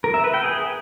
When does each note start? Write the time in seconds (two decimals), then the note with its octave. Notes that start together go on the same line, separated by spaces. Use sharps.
0.04 A#4
0.14 E5
0.24 B4
0.34 G5
0.44 G#4